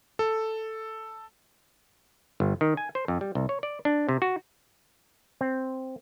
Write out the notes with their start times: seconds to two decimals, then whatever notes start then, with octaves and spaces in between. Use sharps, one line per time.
0.19 A4
2.40 G1
2.61 D#3
2.77 G#5
2.95 C5
3.08 F2
3.21 G3
3.35 C2
3.49 C#5
3.63 D5
3.85 D4
4.09 C3
4.22 F#4
5.41 C4